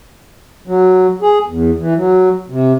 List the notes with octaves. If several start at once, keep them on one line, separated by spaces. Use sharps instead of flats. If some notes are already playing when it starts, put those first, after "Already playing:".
F#3
G#4
E2
E3
F#3
C3